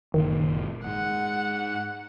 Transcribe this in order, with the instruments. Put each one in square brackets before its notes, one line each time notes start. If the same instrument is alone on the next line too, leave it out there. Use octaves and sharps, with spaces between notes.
[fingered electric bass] F#1 A#2 [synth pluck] D#3
[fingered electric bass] G#2 [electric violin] F#5